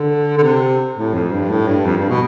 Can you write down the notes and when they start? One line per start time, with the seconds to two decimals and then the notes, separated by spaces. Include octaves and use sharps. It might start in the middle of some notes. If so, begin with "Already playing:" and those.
Already playing: D3
0.38 D3
0.43 C3
0.96 A2
1.14 F2
1.32 G2
1.50 A2
1.68 G2
1.86 F2
1.98 G2
2.10 B2